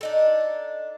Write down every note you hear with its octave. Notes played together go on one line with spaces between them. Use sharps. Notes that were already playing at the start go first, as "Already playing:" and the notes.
D4 D#4 A4